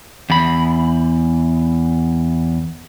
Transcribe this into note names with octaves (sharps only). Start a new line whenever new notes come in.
E2 B5